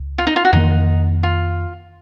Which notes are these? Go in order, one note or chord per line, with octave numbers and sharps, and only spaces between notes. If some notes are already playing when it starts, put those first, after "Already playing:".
Already playing: C#2
F4
D#4
F4
F#4
F2 D#3 A#3 D#4
F4